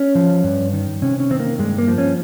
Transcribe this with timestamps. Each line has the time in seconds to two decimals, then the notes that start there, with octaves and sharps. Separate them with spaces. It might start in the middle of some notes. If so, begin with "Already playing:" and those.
Already playing: C#4
0.15 F3
0.44 G2
0.73 D#3
1.02 C3 C#4
1.20 C#4
1.31 D#3 C4
1.40 A#3
1.58 G2 G#3
1.78 A#3
1.88 F3
1.98 C#4